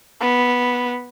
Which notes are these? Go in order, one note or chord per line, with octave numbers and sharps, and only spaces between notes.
B3